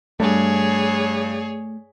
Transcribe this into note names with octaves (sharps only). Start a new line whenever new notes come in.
G2 A3 G#4 C#5